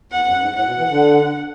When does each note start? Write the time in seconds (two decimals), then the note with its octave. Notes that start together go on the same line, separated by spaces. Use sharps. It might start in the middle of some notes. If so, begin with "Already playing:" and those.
0.12 E2 F#5
0.27 F#2
0.41 G#2
0.55 A2 F#5
0.67 B2
0.78 E3
0.89 D3